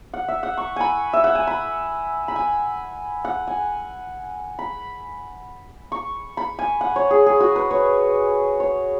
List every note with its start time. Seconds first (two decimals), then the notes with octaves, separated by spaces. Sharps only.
0.14 F#5
0.28 E5
0.43 F#5
0.57 C#6
0.76 G#5 B5
1.13 E5
1.24 F#5
1.35 G#5
1.47 B5
2.28 B5
2.36 G#5
3.25 F#5
3.47 G#5
4.59 B5
5.92 C#6
6.37 B5
6.59 G#5
6.81 F#5
6.96 C#5
7.11 G#4
7.26 G#4
7.40 F#4
7.56 B4
7.71 C#5
8.60 C#5